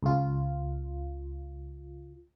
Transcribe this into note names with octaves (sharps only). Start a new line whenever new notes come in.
C#2 F4